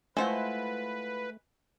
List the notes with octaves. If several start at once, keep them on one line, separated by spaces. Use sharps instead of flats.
G#3 A3 E4 F4 B4 C5 F#5